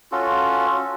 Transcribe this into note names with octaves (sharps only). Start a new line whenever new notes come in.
C#4 F4 F#4 A4